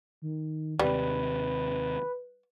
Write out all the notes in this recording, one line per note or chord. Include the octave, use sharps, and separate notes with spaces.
D#3
D#2 C3 G3 B4